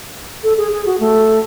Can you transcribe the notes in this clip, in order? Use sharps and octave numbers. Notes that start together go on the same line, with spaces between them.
A4
G#4
G#4
F#4
A3